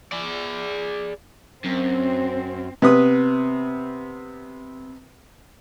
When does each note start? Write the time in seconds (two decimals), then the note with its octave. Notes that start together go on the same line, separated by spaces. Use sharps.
0.12 G#4 D5
1.64 F#2 C4
2.82 C3 B3 B4 D#6